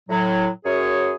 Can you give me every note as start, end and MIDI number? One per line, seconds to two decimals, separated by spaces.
0.09 0.47 45
0.09 0.47 54
0.65 1.14 42
0.65 1.14 68
0.65 1.14 73